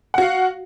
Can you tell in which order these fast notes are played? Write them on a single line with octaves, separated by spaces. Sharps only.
F#5 F#4 F5